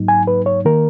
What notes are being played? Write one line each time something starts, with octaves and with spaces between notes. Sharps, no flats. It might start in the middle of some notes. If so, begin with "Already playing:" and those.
Already playing: G#2 F#3 A#3 D#4
G#5
B4
C#5
D#3 A#3 A#4